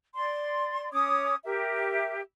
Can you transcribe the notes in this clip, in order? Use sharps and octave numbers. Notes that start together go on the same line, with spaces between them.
D5 C6
C#4 C#5 D6 D#6
G4 A#4 E5